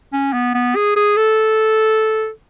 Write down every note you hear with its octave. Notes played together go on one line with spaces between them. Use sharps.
C#4
B3
B3
G#4
G#4
A4